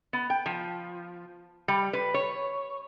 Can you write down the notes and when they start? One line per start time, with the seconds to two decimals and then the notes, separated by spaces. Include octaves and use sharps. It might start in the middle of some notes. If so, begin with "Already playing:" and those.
0.13 B3
0.30 G5
0.46 F3
1.68 G3
1.93 B4
2.14 C#5